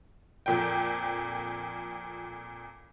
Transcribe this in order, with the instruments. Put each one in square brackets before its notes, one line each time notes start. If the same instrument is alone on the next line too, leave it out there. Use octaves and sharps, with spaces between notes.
[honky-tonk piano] F2 A#2 G5